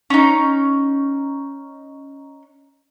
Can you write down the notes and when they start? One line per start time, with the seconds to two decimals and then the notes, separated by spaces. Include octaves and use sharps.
0.10 C#4 D#4